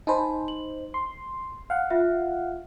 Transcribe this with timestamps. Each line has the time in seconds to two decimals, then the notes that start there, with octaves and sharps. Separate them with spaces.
0.07 D#4 C5 G#5 A5 B5
0.48 F#7
0.94 C6
1.70 F5 F#5
1.90 F4 E5